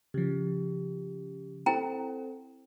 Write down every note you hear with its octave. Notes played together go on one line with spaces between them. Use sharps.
C#3 F3 G4
C4 E4 A4 C5 G5 A#5